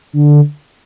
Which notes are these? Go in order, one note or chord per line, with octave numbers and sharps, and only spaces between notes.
D3